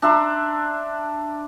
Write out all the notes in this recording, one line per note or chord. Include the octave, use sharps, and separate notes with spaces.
D4 E5 A#5 C6